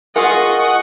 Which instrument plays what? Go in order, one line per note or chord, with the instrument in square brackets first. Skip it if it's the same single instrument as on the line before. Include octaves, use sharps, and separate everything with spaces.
[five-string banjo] F4 G#4 A#4 [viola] D#5 C#6 [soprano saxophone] F#5